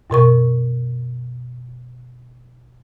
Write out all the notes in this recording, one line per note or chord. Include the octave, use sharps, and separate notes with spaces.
F#2 B2 A#4 C#6